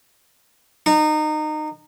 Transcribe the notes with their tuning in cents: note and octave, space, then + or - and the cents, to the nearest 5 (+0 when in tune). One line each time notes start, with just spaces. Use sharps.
D#4 -25